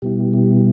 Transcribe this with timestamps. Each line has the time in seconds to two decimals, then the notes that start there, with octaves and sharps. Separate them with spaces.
0.02 B2 G3 B3 E4 G4
0.33 G4